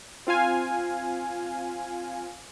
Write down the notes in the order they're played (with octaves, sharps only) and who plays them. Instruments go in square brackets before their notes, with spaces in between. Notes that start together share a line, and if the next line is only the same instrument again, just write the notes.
[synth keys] C4 F4 F5 G#5